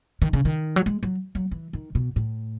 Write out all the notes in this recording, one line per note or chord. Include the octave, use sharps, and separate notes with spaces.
D#3
C#3
D#3
F#3
G#3
F#3
F#3
E3
D#3
B2
A2